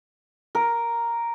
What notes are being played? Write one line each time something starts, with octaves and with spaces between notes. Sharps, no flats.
A#4